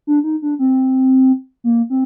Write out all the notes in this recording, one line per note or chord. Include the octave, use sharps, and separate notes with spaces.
D4
D#4
D4
C4
A#3
C4